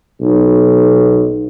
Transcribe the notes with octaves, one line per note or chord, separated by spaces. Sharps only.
B1